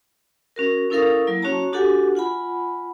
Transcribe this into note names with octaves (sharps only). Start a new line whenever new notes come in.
C#4 F#4 A#4
C#4 E4 A4 A#4 F5 D#6
F#3 A#3 E4
C#4 F#4 C#5 A5 A#5
D4 F#4 G4 A4 F#5 G#5
F4 F#5 G#5 B5